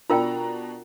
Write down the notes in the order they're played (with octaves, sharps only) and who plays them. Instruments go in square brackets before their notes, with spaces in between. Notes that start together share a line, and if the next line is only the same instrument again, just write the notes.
[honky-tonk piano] B2 D4 A#5 [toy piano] F4 A#4 G5